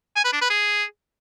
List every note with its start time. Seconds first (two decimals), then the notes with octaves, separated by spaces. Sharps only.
0.16 G#5
0.24 B4
0.33 D4
0.41 B4
0.50 G#4